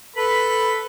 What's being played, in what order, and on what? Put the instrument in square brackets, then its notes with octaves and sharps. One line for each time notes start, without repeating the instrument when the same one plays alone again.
[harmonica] A4 B4 B5